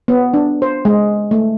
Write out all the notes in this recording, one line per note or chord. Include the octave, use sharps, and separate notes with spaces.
B3
D4
C5
G#3
A3